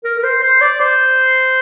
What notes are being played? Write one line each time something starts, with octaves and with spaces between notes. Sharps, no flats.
A#4
A#4
C5
C5
D5
C5